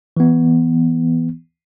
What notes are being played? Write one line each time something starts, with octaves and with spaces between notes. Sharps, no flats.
E3 B3